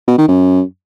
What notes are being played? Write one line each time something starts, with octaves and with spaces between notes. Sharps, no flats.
B2
D#3
F#2